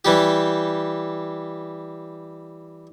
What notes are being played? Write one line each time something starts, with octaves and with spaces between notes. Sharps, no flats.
E3 G3 G4